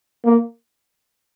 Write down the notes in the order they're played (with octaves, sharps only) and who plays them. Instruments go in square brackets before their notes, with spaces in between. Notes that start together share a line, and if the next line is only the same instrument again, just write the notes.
[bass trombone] A#3